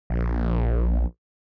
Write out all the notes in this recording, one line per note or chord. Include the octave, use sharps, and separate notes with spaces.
A#1